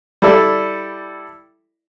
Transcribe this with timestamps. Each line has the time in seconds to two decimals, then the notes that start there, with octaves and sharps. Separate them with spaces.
0.22 G3 E4 A4 D5